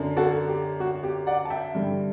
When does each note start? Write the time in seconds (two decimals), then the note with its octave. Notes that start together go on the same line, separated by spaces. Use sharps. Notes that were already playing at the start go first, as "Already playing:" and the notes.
Already playing: F#2 D3
0.17 F#4 A4
0.48 G4
0.80 F#4
1.03 G4
1.27 D5 F#5
1.45 A5
1.50 E5 G5
1.75 G2 D3